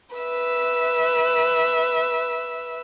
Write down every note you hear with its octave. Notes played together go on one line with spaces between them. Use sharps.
B4 E5